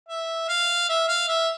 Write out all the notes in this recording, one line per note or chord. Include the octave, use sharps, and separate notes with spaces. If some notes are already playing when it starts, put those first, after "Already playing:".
E5
F5
E5
F5
E5